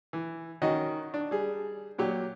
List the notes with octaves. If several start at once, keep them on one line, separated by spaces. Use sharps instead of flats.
E3
D#3 C#4 F#4 D#5
D4
G3 G#4
A#2 F#3 G4